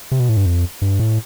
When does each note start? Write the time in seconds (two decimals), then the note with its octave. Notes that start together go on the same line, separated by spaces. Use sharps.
0.11 C3
0.20 B2
0.29 A2
0.37 G2
0.46 F2
0.82 G2
1.00 A2